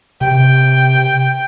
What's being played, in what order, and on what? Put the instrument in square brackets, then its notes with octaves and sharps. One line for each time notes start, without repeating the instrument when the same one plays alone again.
[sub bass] C3 [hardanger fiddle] G5